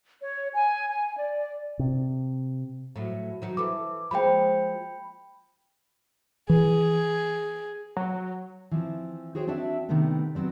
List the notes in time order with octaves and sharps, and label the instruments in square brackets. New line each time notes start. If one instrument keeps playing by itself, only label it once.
[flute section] C#5
G#5
G#5
D5
[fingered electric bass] C3
[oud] A2 F#3
D#3 F#3
[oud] E3 A4 [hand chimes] D6
[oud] F3 G#3 A#3 [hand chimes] G5 B5
[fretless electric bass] E3 [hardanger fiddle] G#4
[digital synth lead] F#3
[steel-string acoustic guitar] E3 F3 C4
F#4 G#4 C5 C#5 G5
C4 D4 F#4 D5 E5
C3 D#3 A3 B3 C4 D4
F#3 B3 C4 D5